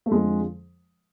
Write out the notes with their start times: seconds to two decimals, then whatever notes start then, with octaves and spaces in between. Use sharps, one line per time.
0.06 A3
0.11 F2 D3 F3 G#3